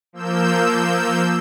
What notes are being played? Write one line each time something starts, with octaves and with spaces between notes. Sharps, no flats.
F3 A#3 E6 G6